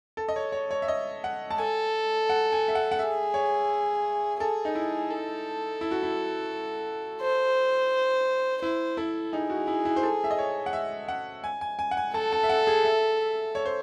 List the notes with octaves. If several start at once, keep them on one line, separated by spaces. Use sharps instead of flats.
A4
D#5
C#5
C#5
C#5
E5
D#5
F#5
A5
A4 G#5
F#5
G#5
E5
F#5
F#5
G#4 E5
C#5
G#4 A4
D#4
E4
A4
E4
F#4
E4
C5
E4 C5
E4 A4
D#4 G#4
F#4
E4
E4
C5
A4
E5
D#5
C#5
F#5
E5
F#5
G#5
G#5
G#5
F#5
G#5
A4 A5
A5
E5
F#5
G#4
E5
C#5
C5